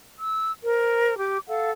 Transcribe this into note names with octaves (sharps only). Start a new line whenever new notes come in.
E6
A#4 C5
G4 D6
A4 F5 F#5